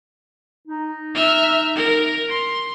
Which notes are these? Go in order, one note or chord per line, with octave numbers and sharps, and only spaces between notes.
D#4
E5 F6
A#4
C6